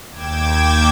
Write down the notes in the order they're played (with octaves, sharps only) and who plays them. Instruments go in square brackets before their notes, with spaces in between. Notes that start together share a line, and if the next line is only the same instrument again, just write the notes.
[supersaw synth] D#2 G5 D6 G#6 E7